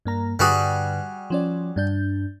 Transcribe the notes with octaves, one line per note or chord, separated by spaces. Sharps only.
G2 A#3 A#5
G2 D3 G3 F#4 G#4 B4
F3 C#4 D5
G2 D4 G6